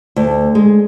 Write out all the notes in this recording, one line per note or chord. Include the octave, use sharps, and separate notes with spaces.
D2
G#3